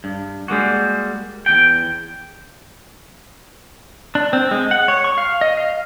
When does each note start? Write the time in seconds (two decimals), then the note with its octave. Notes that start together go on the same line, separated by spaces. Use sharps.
0.04 G2
0.48 G3 G#3 A#3 F#4
1.46 E2 G5
4.15 D4
4.33 C4
4.51 G#3
4.71 F#5
4.88 C#5
5.04 C#6
5.18 F5
5.41 D#5
5.57 F5